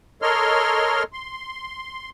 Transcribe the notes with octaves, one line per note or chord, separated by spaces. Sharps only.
A4 A#4 C#5 D#5 C6 F6
C6